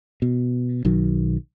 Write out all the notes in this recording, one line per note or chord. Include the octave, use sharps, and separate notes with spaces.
B2
B1 D#3 F#3